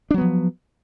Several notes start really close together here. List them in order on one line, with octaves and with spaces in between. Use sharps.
D4 F#3 B3 F3